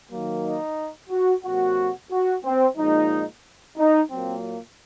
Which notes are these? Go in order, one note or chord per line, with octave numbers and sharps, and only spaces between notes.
D#3 F#3 A#3
D#4
F#4
C3 F#3 A#3 F#4
F#4
C4
A#2 F3 G#3 D#4
D#4
A#2 F#3 A#3 C4